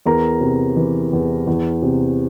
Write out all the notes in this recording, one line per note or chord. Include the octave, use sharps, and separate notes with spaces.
E2 A#4 A#5
C3
E3
E2
E2
C3